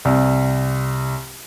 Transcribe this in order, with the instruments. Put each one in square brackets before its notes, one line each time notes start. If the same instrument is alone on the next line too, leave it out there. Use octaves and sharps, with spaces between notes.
[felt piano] C2